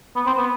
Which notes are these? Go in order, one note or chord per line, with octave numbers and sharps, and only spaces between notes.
B3
C4
B3